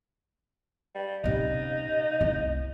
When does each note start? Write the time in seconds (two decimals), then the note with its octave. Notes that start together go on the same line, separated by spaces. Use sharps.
0.95 G3
1.24 C3 C#4 D#4
2.21 C2 A3